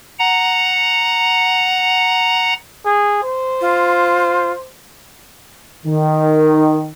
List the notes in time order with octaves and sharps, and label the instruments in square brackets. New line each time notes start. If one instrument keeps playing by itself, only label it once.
[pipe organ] F#5 A#5
[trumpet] G#4
C5
[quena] F4
[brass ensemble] D#3